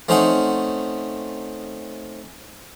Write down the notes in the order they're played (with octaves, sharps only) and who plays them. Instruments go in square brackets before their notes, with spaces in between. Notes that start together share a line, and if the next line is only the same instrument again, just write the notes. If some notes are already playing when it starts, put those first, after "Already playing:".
[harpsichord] A3 C4 C#4 D#4 C5 F#5